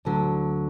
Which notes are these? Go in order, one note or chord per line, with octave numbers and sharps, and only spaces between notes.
D2 D3 F#3